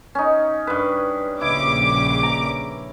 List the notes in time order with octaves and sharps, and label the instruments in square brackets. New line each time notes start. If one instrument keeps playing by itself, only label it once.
[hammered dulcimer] C#4 D#4
G2 B4
[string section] A#1 C#3 D6 [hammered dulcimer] E4
[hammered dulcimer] A#5